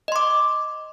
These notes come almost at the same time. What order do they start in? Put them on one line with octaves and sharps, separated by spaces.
D#5 C6 D6